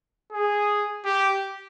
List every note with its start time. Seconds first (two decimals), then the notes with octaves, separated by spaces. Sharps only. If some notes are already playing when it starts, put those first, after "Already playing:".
0.33 G#4
1.05 G4